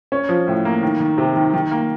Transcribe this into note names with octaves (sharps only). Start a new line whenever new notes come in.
C#4
F3
A2
A#3
D#3
D#3
C3
D#3
D#3
A#3